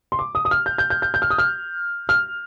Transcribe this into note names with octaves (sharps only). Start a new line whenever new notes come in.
C6
D6
D#6
D#6
F6
G6
G6
G6
G6
G6
F6
D#6
F6
F6